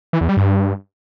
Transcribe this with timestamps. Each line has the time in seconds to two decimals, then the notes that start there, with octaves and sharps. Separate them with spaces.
0.13 E3
0.21 E2
0.29 G3
0.37 G2